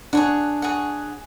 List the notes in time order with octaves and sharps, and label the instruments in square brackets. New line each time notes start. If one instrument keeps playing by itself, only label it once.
[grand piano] D4 [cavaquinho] G#4 C#5 F#5
[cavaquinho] G#4 C#5 F#5